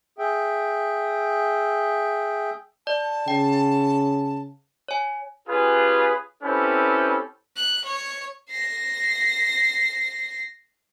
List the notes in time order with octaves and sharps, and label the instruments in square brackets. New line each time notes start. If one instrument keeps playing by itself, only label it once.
[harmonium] G#4 E5 G5
[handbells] D5 [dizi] A5
[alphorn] C#3 [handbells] G5
[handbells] C#5 G#5
[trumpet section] C#4 F4 G4 G#4 B4
C4 C#4 E4 G4 A4 B4
[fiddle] F#6
C#5
[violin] A#6 C7